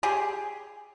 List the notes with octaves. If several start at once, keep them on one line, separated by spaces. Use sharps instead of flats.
G4 G#4